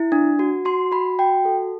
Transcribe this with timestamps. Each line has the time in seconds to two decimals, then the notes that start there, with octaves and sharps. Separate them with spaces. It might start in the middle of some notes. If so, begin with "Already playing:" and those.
Already playing: E4
0.12 D4
0.39 F#4
0.65 F#4 C6
0.92 F#4 B5
1.19 F#4 G5
1.45 A4